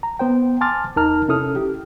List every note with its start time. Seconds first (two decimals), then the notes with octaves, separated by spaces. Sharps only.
0.03 A#5
0.19 B3 C5 G5
0.61 G#5 A5 C6 D6 F6 A6
0.96 E2 D#4 A#4 A5 A#5 F6
1.28 C3 C#4 E4 A4 D#6 F6
1.56 G4